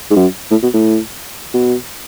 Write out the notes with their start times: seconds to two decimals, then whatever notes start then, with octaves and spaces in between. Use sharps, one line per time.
0.11 G#2
0.16 F#2
0.51 A2
0.63 B2
0.74 A2
1.54 B2